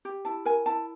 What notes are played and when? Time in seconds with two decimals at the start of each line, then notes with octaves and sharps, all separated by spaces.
0.05 G4
0.25 E4 A5
0.45 A#4 G#5
0.66 E4 A5